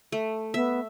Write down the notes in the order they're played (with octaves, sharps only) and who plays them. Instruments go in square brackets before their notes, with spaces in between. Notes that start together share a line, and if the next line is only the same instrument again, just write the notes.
[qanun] A3
[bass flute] B3 [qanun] E5